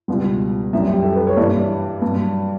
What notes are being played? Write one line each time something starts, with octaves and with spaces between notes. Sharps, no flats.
C#2 B2 G3
F#2 E3 G3 E5
G4
A4
B4
C#5
G2 E3 G3 D5
G2 F#3